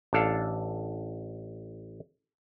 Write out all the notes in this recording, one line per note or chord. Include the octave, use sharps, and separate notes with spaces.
A1 D4 A4 F5